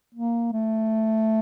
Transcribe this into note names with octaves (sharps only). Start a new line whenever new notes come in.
A#3
A3